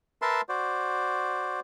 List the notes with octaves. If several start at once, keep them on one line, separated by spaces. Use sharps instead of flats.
A#4 B4 E5 A5 C6
F#4 C5 D5